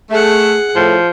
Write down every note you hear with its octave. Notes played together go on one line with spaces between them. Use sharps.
A3 G#4 F#5
A2 F3